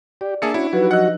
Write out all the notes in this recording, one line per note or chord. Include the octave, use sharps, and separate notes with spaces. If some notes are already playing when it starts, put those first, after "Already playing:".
G4 D5
A#3 D4 G#4 E5 A5 C#7
C#4 E4 F#4
F3 F#3 D#4 F#4 G4 B4
F3 B4 D#5 F#5 E6 F#6